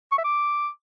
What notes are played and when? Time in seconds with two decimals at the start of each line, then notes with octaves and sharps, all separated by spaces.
0.12 C#6
0.18 E5
0.24 D6